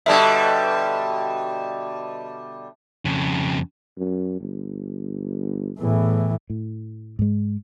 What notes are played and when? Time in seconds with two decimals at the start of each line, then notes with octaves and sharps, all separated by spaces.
0.06 B2 D3 G3 E5 A5
3.05 F2 C#3
3.98 F#2
4.40 G1
5.79 E2 A2 E3
6.50 A2
7.19 G#2 G#3